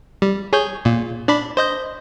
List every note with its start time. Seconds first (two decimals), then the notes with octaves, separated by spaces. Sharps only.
0.22 G3
0.53 G#4 C#5 G6
0.85 A#2
1.28 D4 D5 B5
1.57 C5 D#5 G6